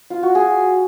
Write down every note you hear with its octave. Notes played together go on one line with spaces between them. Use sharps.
F4
F#4
G#4